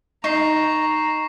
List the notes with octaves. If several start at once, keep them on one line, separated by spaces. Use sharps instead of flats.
D#4 A#5 C#6 C7